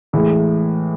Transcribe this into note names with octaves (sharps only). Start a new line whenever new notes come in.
A2 E3 G#3